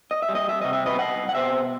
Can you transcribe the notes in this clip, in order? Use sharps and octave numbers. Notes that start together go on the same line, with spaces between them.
D#5
E5
G3
D#5
E5
C3 D#5
E5
B4 D#5
C2 D#5 F#5
F#5
B2 C5 E5